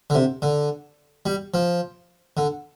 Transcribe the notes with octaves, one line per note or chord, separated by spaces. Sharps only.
D3
C3
D3
G3
F3
D3